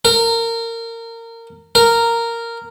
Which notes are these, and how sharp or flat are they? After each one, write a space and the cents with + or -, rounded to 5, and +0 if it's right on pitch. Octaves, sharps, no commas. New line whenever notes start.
A#4 -25
A#4 -10